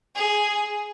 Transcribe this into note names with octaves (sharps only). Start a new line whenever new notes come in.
G#4